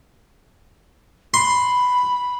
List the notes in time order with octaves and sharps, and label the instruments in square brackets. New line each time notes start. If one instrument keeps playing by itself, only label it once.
[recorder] B5 [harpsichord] C6